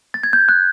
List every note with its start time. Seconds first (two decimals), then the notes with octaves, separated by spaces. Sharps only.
0.14 A6
0.23 G#6
0.33 G6
0.49 F#6